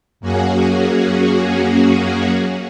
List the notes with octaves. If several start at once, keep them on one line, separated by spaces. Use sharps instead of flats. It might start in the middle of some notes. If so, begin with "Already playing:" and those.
F#2 A#3 C#4 F#4 G#4